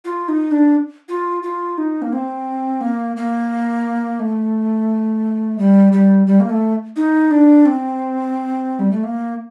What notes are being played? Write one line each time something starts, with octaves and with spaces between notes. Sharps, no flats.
F4
D#4
D4
F4
F4
D#4
A#3
C4
A#3
A#3
A3
G3
G3
G3
A#3
A3
D#4
D4
C4
G3
A3
A#3